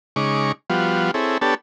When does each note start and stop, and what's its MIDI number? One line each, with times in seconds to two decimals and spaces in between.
0.16 0.52 49
0.16 0.52 56
0.16 0.52 63
0.16 0.52 85
0.16 0.52 86
0.70 1.11 53
0.70 1.11 55
0.70 1.11 59
0.70 1.11 65
0.70 1.11 66
1.14 1.38 60
1.14 1.38 64
1.14 1.38 68
1.14 1.38 69
1.14 1.38 73
1.41 1.55 59
1.41 1.55 62
1.41 1.55 67
1.41 1.55 69
1.41 1.55 73
1.41 1.55 81